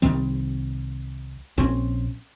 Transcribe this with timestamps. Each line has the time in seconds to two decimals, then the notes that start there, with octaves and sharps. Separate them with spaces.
0.02 C2 D#3 G3 C4
1.58 A#1 C4 C#4